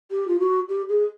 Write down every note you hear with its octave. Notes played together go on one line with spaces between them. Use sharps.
G4
F4
F#4
G4
G#4